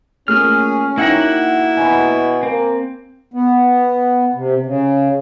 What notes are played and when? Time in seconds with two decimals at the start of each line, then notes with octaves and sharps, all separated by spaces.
0.28 A3 A#3 C#4 F4 G#4 F6
0.98 A#3 D#4 E4 F#4 F#5 G5 A#6
1.77 B2 G#5 B5
2.43 A#3 C4
3.34 B3
4.35 C3
4.66 C#3